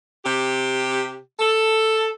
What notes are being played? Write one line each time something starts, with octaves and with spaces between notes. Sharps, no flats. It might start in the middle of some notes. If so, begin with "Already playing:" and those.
C3 G4
A4